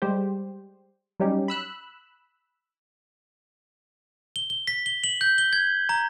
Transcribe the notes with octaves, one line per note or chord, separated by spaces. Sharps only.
G3 G#3 G4 C5
F#3 G3 C#4 D#4 G4
B5 E6 F#6
G7
G7
B6
G7
F#7
G6
G7
G#6
A#5